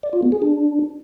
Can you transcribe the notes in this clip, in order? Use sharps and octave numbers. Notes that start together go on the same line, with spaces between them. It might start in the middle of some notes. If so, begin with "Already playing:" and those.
D5
F4
B3
G#4
D4